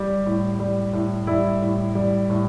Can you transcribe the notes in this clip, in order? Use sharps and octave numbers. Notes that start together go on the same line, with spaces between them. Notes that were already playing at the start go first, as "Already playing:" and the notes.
Already playing: G3 G4
A2
G3
A2
G3 E4
A2
G3
A2